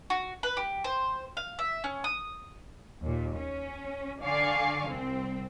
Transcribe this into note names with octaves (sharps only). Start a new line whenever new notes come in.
F#4
B4
G4
C5
F5
E5
C#4
D#6
D#2 A#2
C#4
D3 D5 F5 G#5 C#6 C7
C2 C4